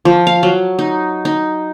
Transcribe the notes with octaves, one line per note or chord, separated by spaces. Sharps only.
F3
F5
F#3
D#4
D#4